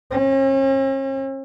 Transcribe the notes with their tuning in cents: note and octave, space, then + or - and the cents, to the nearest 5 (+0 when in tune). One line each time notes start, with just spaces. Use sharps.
C#4 -45